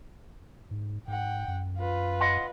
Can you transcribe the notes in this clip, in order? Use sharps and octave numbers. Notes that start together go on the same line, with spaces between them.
G#2
G#2 F#5 G5
F#2
F4 B4
D#5 F#5 C6